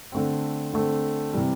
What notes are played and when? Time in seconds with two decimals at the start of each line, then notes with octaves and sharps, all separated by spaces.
0.12 D3 A3 C4
0.73 D3 A3 C4
1.33 C3 E3 G3